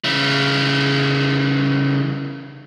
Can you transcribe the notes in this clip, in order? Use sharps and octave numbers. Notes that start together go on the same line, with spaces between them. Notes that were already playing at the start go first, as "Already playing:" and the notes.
C#3 E3